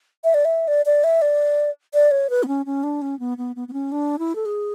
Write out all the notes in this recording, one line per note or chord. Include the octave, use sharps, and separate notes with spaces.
E5
D5
E5
D5
D5
E5
D5
D5
C#5
B4
B3
C#4
C#4
D4
C#4
B3
B3
B3
B3
C#4
D4
E4
A4
G#4